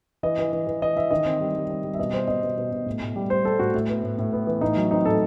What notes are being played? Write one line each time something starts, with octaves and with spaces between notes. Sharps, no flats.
E3 D#5
E3
E3
E3
E3 D#5
E3 E5
D#3 D#5
C4
G3
G3
C4
G3
E5
B2 D#5
G3 C5
B2 D#5
B2
B2
B2
A2
A2
G3
G3 C5
G3 A4
A2 F#4
A2
B3
A2
A2
B3
E3
A2 D#4
F#3
C4 D#4
A2 A4